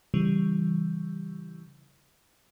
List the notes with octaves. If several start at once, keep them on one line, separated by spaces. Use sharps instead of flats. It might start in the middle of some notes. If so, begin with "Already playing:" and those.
C#3 E3 G3